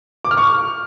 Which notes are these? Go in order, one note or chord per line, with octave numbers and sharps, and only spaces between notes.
D6
F6
C#6